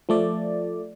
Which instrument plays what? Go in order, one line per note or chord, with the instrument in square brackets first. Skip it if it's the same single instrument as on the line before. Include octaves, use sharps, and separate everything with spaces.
[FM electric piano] F3 A3 D5